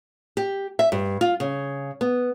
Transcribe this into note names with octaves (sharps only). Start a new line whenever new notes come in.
G4
E5
G2
F4
C#3
B3